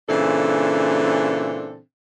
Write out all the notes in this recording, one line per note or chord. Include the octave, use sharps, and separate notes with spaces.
A#2 C#3 E3 C4 D4 A4